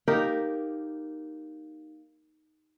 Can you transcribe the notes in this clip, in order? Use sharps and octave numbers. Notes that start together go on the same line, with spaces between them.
A#3 D#4 G4 A#4